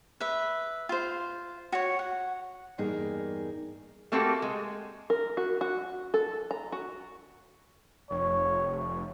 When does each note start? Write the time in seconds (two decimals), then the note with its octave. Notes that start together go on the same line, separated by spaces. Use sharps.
0.20 B4 E5
0.89 F4 C5
1.72 F#4 C#5
1.99 F#5
2.78 E2 G2 A#3 D#4 G#4 A#4
4.12 A3 A#3 C4 F#4 G4 A4
4.42 G#3
5.10 A#4
5.37 F#4
5.61 F#4
6.14 A4
6.51 A#5
6.72 F#4
8.10 F1 C#5